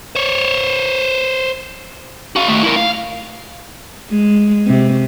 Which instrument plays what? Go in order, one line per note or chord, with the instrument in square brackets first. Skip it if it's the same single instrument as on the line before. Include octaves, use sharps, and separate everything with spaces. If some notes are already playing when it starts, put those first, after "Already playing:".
[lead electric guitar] C5 C#5
F#4 F5
D#3 A3
E4 A#4
F5
[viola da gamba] G#3
C3